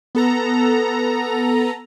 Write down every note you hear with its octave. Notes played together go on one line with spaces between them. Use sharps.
B3 A4 A#5